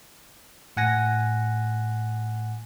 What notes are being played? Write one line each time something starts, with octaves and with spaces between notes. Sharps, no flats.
A2 F#5 G#5 A#6